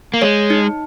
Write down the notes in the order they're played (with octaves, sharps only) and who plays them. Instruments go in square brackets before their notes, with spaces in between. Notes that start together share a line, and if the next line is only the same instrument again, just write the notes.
[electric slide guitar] A#3
[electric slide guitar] G#3 [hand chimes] C#5
[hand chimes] D#4